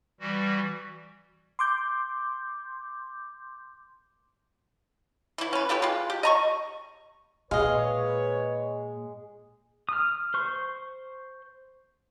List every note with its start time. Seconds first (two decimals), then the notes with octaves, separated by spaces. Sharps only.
0.20 E3 G3 F#4
1.59 C6 D6 G6
5.38 E3 E4
5.53 C#4 B4
5.69 A3 E4 G4 B4
5.82 G#3 F4
6.10 G4
6.23 D#5 A#5 C#6
7.51 A#2 G#3 B4 C#5 D#5 F5
9.89 D#6 F6
10.34 C5 C#6